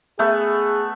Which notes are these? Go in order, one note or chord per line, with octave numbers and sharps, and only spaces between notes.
A3 B3 G#4